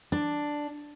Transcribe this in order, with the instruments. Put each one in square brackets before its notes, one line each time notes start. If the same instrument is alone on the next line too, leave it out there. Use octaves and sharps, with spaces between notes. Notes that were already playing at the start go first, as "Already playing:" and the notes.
[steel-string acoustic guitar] D4